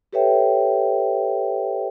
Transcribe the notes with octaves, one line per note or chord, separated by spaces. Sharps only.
G4 A4 B4 C#5 E5 G5